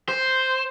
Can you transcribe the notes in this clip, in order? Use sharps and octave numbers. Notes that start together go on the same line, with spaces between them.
C5